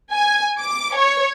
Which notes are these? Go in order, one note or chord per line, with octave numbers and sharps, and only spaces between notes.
G#5
D6
C#5